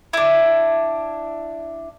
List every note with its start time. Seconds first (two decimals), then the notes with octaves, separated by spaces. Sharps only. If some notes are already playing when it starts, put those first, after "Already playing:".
0.13 D4 E4